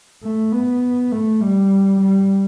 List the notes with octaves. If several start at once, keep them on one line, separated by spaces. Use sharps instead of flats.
A3
B3
A3
G3
G3